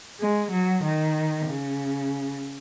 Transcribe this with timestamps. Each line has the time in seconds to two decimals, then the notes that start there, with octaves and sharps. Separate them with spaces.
0.17 G#3
0.50 F#3
0.82 D#3
1.46 C#3